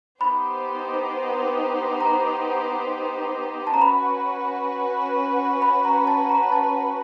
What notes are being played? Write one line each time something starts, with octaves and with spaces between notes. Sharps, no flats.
B3 D#4 G4 C5 B5
A#5
A5
A#5
C#4 F#4 B4 B5
B5
A#5
A5
A#5
A5